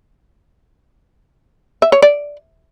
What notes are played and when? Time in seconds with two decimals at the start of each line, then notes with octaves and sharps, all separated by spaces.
1.82 E5
1.92 C#5
2.02 D5